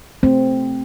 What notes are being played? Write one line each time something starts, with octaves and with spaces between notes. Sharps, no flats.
A3 C4